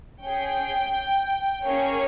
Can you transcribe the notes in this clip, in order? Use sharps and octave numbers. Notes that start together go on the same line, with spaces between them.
C#4 G#4 G5
A#3 C#4 G#4 C#5